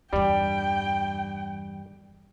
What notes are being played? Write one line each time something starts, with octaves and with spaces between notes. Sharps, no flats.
E2 G2 G3 G5